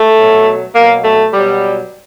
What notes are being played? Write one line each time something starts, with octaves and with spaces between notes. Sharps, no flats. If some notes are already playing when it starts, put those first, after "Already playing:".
Already playing: A3
B2 F#3
B2 F#3 A#3
A3
B2 F#3 G3